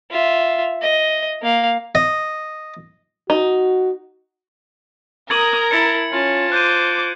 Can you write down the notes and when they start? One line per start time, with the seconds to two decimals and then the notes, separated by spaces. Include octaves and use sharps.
0.11 F4 E5
0.82 D#5
1.43 A#3 F5
1.95 D#5
3.30 D#4 F#4
5.30 A#4 A#5 D#6 G#6 F#7
5.71 E4 A5 C#7
6.12 C#4 F4 A5
6.52 C5 D6 F#6 G6 D#7